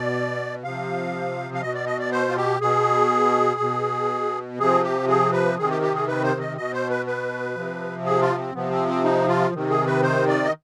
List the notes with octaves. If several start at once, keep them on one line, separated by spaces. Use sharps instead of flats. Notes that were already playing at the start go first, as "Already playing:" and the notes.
Already playing: B2 D5
C3 F3 F5
F5
B2 D#5
D5
D#5
D5
C5
F4
G4
B2 G#4
B2
C3 F3 G#4
G4
G#4
B4
C3 D#3 G#4
G4
G4
G#4
B4
C5
D#5
B2 D#5
C5
B4
B4
C3 F3
G#4
F4
C4
C3 F3 B3
C4
C4
D#4
F4
C3 D#3
G#4
B4
C5
D5
D#5